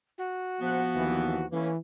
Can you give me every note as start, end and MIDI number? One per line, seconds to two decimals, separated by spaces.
0.17 1.45 66
0.61 0.83 34
0.61 1.45 53
0.61 1.45 59
0.61 0.83 72
0.61 0.83 78
0.95 1.47 39
0.95 1.42 52
1.53 1.77 52
1.53 1.70 57
1.53 1.70 58
1.53 1.70 61
1.53 1.70 71